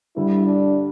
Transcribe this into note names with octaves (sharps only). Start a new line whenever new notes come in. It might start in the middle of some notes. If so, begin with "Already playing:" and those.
G2 D3 G3 E4
D4